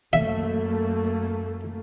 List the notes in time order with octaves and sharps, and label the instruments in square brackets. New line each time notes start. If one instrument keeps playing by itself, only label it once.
[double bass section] F#2 A3 A#3 [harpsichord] E5